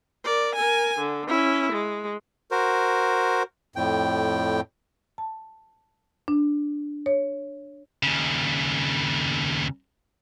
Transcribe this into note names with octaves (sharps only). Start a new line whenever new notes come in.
A#4 D5
A#4 G#5
D3
C#4 E4
G#3
F#4 A#4 C5
F2 A2 G5
A5
D4
C#5
D#2 C#3